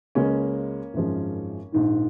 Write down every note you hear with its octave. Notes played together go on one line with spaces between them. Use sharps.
C#2 C#3 G#3 A#3 C#4
G#1 F#2 F3 G#3
A#1 G#2 D#3